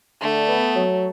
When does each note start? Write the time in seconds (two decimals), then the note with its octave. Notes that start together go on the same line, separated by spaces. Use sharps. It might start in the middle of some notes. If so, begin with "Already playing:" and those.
0.22 D3 A3
0.48 B3
0.75 F#3